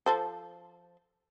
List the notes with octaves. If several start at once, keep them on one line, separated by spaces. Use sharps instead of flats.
F3 A4 C5